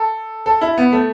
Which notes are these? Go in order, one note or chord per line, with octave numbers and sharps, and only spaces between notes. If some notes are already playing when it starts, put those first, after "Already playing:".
Already playing: A4
A4
E4
B3
A3